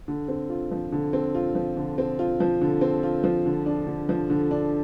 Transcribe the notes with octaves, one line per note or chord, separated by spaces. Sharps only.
D3
C4
F4
F3
D3
C4
F4
F3
D3
C4
F4
F3
D3
C4
F4
F3
D3
D4
D3
F3
D3
D4